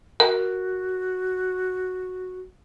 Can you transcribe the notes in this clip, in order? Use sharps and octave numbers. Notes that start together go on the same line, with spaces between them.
F#4 A#4